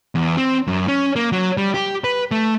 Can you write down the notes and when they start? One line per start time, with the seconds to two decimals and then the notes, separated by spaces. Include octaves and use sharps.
0.15 E2
0.37 C4
0.67 F#2
0.88 C#4
1.16 A#3
1.32 F#3
1.57 G3
1.74 G4
2.04 B4
2.31 A3